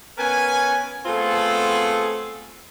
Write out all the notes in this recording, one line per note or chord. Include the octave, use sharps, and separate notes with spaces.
B3 C#4 A#4 B4 G#5
A3 B3 C4 F4 G#4 A4